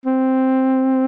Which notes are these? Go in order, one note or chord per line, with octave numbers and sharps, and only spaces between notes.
C4